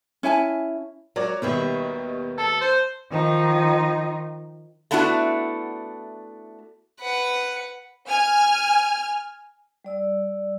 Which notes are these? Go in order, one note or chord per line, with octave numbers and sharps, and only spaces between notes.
C#4 E4 G#5 A5
F#3 A#4 C#5 D5
D#2 B2 D#3 G3 B4 E5
A4 A5
C5
D#3 F3 D#4
A3 B3 D4 E4 F#4
B4 F#5
G#5 F6
G3 D5 E6